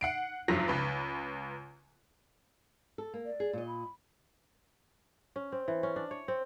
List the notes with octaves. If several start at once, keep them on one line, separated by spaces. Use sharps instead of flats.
F#5 C7 D7
F1 G2 F3 F#3 A#6
C#2 B4
A4
A#3
D5
G#4
A#2 D#5
B5
C#4
C4
E3
C#4
D4
C#5
C4